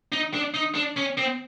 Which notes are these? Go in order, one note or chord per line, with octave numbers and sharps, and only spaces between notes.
D#4
D4
D#4
D4
C#4
C4